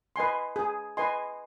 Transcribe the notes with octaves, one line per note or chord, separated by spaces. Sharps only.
B4 D#5 G#5 C6
G#4
B4 D#5 G#5 C6